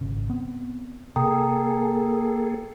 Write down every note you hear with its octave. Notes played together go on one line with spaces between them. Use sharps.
G#1 C#3
B3 C4
C3 A#3 G#4 A4 G5 A#5 D#6